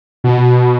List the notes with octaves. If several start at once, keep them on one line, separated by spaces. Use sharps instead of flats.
B2